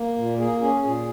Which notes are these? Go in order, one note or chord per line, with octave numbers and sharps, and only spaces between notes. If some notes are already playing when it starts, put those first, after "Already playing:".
Already playing: A#3
A#2
A#3 G#4
C#4 G#4
A#2 G#4